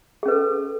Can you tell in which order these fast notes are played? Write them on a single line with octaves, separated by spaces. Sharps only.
G#4 C#4 B4 A4